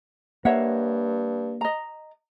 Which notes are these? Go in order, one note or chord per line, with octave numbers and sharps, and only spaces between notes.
G2 A#3 C#5 E5 F#5
D#5 A#5